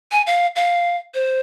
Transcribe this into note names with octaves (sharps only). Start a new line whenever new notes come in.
G#5
F5
F5
C5